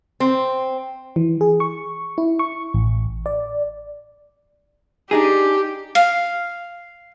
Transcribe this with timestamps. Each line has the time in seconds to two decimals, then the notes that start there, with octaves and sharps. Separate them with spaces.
0.20 C4
1.16 E3
1.41 G#4
1.60 C#6
2.18 E4
2.39 C#6
2.74 A1
3.26 D5
5.11 D4 D#4 G4 G#4
5.95 F5